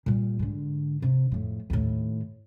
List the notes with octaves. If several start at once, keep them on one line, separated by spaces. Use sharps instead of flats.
A#2 G3
G#2 D3
C3
F2 A2
D#2 A2